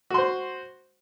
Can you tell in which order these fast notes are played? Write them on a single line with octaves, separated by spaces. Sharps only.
F#4 C6 C5